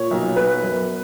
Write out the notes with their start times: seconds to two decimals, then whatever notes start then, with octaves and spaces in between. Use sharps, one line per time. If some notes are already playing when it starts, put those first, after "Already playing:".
Already playing: A#2 C#5
0.11 B1
0.36 B3 B4
0.63 F#2